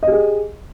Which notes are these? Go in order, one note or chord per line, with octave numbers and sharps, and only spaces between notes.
G4 G#4 D#5